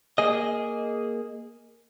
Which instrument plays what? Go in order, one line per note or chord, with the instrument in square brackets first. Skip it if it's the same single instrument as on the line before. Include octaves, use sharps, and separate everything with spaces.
[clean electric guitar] A#3 G#4 D#5